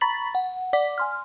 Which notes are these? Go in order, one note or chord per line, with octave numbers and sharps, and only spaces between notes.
A#5 B5 C#6 A6 B6 F#7
F#5
D5 F#5 D6 B6
G#5 C6 F6